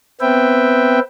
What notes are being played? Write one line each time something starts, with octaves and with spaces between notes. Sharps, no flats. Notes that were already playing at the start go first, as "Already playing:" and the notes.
B3 C4 B4 E5 G5